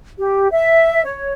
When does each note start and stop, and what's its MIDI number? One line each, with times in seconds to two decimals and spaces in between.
0.19 0.47 67
0.51 1.02 76
1.05 1.32 73